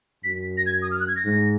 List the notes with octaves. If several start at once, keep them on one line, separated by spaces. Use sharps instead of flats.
F#2 B6
A#6
G#6
D#6
F6
F#6
G#6
A#6
G#2